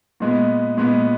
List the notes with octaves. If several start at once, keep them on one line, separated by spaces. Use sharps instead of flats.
A#2 G#3 B3
A#2 G#3 B3